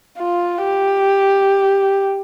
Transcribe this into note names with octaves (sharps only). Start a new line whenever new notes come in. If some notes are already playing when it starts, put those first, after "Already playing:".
F4
G4